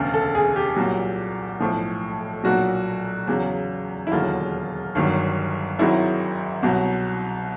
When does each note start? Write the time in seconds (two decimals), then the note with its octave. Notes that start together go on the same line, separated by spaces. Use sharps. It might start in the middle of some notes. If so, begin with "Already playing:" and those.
Already playing: E1 D2 C#3
0.14 A4
0.35 G#4
0.56 G4
0.76 C2 A#2 F#3
1.60 B1 A2 F3
2.44 B1 A#2 F#3 F#4
3.27 E2 C#3 F#3
4.07 E4
4.11 E1 D#2 D3 F#3 F4
4.95 G1 G2 D#3 F#3
5.79 G#1 G#2 D#3 F#3 E4
6.63 C2 B2 F#3